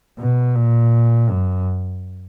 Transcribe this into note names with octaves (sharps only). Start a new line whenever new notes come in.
B2
A#2
F#2